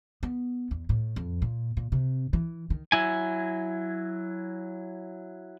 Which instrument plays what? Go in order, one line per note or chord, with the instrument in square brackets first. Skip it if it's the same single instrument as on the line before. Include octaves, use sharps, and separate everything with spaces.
[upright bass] B3
E2
A2
F2
A#2
A#2
C3
E3
D#3
[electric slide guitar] F#3 E4 G#5